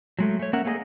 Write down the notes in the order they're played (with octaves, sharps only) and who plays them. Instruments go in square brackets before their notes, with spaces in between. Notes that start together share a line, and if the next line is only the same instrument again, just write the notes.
[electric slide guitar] F#3 G#3 A3
A3 C#5
A#3 C#4 A#4 E5 F#5
A3 A#3 G#4 B4 D#5